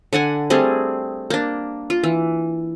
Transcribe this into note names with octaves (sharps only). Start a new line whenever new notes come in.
D3 D4 F#5 G#5
G3 A3 C4 G#4
A#3 D4
F4
E3